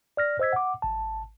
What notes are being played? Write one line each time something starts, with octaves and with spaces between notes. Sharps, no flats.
D5 F6 A#6
C5 D#5 E6 G#6 B6
F#5 D6
G#1 A5